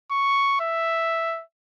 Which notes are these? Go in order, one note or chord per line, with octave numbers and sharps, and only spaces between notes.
C#6
E5